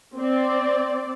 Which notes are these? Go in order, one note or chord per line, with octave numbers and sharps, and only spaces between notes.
C4 D5